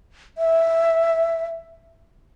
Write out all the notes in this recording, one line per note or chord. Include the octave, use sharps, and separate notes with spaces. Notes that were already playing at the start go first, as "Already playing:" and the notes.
E5